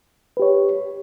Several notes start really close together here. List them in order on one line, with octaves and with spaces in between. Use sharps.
B4 G4 C#5